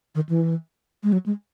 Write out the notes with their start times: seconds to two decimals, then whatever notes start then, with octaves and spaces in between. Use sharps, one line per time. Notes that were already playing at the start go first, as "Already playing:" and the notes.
0.15 D#3
0.29 E3
1.04 G#3
1.12 F#3
1.26 G#3